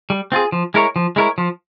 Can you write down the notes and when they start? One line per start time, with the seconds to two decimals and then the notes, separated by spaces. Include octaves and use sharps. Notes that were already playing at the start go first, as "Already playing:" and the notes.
0.10 G3
0.32 C4 F4 G#4
0.52 F3
0.74 G#3 E4 A#4 C#5
0.96 F3
1.16 G#3 E4 A#4 C#5
1.38 F3